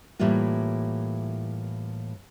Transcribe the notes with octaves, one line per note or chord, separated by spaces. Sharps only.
A2 E3 G3 A#3 F4